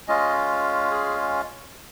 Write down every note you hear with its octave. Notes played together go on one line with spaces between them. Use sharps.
G#3 C#4 F4 D#5
G#4